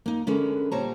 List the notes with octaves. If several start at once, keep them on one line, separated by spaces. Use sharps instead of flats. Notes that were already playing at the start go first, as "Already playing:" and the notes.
A#3 D#4
D3 G#3 C#4 A#4 B4
A#2 G3 C5 C#5 A5 A#5